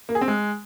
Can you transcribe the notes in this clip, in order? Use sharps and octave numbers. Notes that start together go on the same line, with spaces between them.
A#3
G#4
C4
G#3